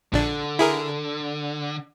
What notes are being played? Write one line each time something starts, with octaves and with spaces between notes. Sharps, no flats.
A#1 D3 D4
E4 G#4 A#4